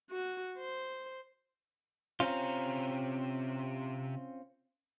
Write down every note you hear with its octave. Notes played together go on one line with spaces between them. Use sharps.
F#4
C5
C3 C4 C#4 F4 A#5